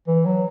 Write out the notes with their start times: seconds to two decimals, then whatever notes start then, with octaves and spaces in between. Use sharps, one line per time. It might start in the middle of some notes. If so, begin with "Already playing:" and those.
0.07 E3
0.26 F#3